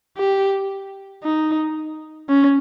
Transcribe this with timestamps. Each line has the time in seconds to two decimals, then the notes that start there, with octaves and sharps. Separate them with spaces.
0.17 G4
1.23 D#4
2.29 C#4